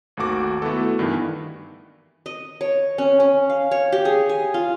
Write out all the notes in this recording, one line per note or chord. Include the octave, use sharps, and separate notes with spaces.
G#1 D#2 A3 F#4 D6
A3 B3 E4 F#4 A4
G2 D#3 E3 B3
D#5
C#5
C#4
C#4
F5
C#5
G4
G#4
G#5
F4